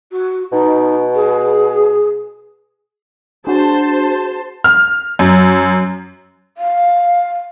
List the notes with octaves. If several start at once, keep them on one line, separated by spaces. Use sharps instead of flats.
F#4
B2 D#4
G#4
D4 F#4 G#4 C5 A5
F6
F#2
F5